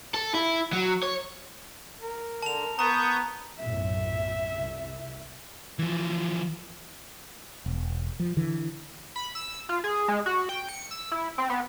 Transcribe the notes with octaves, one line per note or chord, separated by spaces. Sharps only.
A4
E4
F#3
C#5
A#4
D3 A5 F7
B3 A#5 C#6 D#6 G6
B1 F#2 A2 E5
C2
E3 F3
E1
F3
D3 E3
B5
E6
F4
G#4
G#3
F#4
G5
C#7
E6
E4
C4
B3